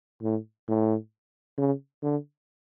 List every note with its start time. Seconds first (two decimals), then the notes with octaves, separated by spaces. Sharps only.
0.22 A2
0.68 A2
1.58 C#3
2.03 D3